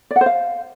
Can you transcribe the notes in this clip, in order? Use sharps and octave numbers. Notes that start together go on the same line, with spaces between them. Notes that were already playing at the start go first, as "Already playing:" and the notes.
D5
F#5
C5
F5